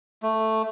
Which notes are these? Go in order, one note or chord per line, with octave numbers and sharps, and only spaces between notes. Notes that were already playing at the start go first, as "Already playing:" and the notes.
A3